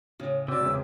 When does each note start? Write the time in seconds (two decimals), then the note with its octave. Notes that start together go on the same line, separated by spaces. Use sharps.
0.20 A2 C#3
0.48 C3 F#4 D5 D6 E6
0.60 E1 C#3